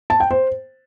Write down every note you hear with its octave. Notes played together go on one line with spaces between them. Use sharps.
A5
G5
C5